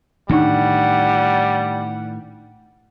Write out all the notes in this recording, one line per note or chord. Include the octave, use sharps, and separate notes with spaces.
A2 D#3 E3 G3 D4 D#4 F#5 C#6